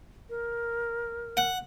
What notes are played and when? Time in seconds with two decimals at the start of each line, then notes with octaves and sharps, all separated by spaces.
0.30 A#4
1.37 F#5